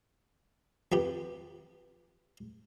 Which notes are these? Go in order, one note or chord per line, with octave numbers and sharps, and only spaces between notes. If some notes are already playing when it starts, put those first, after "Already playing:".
F2 G4 B4